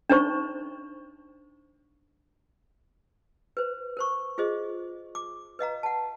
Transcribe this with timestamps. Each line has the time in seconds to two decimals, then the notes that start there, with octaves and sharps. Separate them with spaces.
0.10 D4 D#4 C5 C#6
3.57 B4 C5
3.97 A#4 C5 C#6
4.38 F4 G#4 C5 D#5
5.15 D6
5.59 B4 D#5 F5 A#5
5.83 F#5 A5